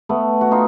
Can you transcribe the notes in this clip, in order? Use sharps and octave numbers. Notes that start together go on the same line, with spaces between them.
A3 B3
F#4
D#4 F4